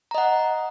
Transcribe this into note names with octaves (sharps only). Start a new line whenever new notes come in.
D#5 F#5 A#5